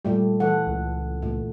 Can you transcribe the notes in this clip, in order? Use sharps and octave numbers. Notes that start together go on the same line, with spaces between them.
A#2 G3 A3 G4
E3 A4 F#5
C#2
A#2 A3